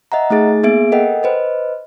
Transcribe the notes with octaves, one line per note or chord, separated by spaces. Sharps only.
D#5 E5 F#5 A#5
A3 D#4 G#4 A6
A#3 B3 G#4 E5 D7
A4 A#4 D#5 F#5 G5
B4 C5 D#5